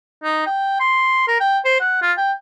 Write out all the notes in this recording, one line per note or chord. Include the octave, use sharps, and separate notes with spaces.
D#4
G5
C6
A#4
G5
C5
F#5
F4
G5